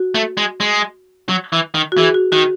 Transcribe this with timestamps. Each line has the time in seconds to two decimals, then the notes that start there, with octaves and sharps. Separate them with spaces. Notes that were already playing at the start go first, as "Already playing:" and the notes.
Already playing: F#4
0.15 A3
0.37 G#3
0.60 G#3
1.29 F#3
1.53 E3
1.74 D#3
1.92 F#4
1.97 E3 G#4
2.14 F#4
2.32 D#3 F#4